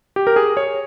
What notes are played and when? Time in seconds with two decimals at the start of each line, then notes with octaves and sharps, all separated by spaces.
0.16 G4
0.27 A#4
0.36 G#4
0.57 C#5